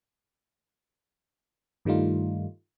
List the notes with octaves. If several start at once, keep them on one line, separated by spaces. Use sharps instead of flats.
G2 D#3 G3 A3 D#4 F4